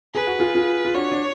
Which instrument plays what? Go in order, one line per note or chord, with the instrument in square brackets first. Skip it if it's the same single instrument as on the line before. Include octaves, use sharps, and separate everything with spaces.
[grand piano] G#4 [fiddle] B4
[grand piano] F#4
F4 G#4
F4 G#4
F4
[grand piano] D4 F#4 [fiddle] C#5
[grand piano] D4